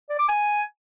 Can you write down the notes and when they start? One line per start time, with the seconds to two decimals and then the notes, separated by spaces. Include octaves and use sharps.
0.09 D5
0.19 D6
0.29 G#5